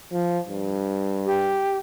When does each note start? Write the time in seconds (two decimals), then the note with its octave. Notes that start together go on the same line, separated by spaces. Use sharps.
0.13 F3
0.49 G2
1.26 G4